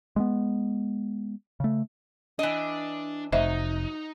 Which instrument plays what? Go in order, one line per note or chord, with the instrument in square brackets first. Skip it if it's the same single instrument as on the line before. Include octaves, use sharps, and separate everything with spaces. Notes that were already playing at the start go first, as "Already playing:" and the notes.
[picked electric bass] G#3 A3 B3
C#3 A3
[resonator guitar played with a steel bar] E3 D#5 [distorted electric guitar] D4
[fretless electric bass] F1 [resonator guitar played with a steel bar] F#3 [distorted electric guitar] D#4 [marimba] C5 D#5 E5